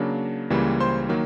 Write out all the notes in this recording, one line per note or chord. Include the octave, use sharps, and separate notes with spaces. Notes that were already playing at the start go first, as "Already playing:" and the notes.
Already playing: C#3 F#3 A#3 D4
C#2 C#3 E3 G3 A#3
C5 C6
D#3 F#3 A#3